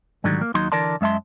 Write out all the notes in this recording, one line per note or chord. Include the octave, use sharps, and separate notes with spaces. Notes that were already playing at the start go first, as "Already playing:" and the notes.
G#2 D3 D#3 F#3 G3
A#3
D#2 F#3 D#4 C6
D3 E3 A#4 D5 A5 C6
F#2 G#3 E5 A5 C6